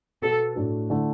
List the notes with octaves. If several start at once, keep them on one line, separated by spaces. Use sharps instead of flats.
B2 B3 F#4 A4
A2 A3 D4 F#4
D3 A3 E4